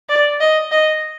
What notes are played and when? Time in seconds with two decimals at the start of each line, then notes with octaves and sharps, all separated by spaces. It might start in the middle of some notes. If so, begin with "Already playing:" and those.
0.09 D5
0.40 D#5
0.71 D#5